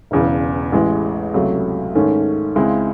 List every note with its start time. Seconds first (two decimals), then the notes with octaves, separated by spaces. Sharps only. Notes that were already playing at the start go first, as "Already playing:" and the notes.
0.11 E1 E2 C#3
0.72 A1 A2 G#3
1.34 C#2 C3 F#3 A3
1.95 G#2 D#3 A3 C#4
2.56 C#2 C#3 G#3 C4 E4